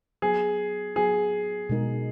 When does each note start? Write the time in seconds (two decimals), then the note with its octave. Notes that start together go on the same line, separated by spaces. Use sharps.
0.22 F#3 B3 F#4 G#4
0.96 F#3 B3 F#4 G#4
1.69 B2 G#3 D#4 A#4